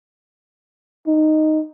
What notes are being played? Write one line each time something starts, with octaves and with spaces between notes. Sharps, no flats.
D#4